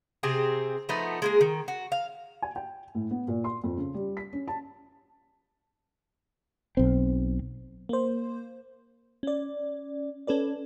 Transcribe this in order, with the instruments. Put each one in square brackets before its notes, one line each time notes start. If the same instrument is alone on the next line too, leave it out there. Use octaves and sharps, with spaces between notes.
[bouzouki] C3 C4 G4 G#4
F3 A3 B3 D#4
G#3 A#3 G#4
D#3
F#4
F5
[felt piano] G#5
G5
A2
B3
A#2
C6
F2
C#3
G3
B6
C#4
A5
[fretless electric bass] B1 C4
[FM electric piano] A#3 C5
C#4 D5
C#4 A4 B4 D5